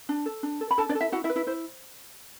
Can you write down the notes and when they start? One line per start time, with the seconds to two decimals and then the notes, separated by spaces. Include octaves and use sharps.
0.09 D4
0.26 A4
0.43 D4
0.61 A4
0.71 B5
0.78 D4 A4 A5
0.89 D4 D5
0.95 A4
1.01 E4 E5
1.12 E4 F#4 F#5
1.24 E4 E5
1.29 B4
1.36 E4 E5
1.47 E4 C5